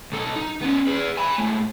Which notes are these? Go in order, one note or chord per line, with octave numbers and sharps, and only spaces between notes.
B1 A4
D#4
B3 C#4
G#4 B4
G#5 B5
G#2 A3